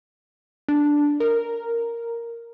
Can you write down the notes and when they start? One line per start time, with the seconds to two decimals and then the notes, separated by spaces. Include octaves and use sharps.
0.68 D4
1.20 A#4